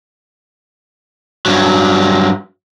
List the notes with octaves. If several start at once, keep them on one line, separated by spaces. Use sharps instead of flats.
G2 F#3